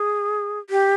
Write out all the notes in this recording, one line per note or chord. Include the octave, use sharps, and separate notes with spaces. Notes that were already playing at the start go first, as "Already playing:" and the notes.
Already playing: G#4
G4